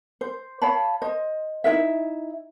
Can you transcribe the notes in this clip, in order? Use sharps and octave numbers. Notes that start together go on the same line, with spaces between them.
C5
C#5 F5 A5 B5
C5 D#5
D#4 E4 A#4 E5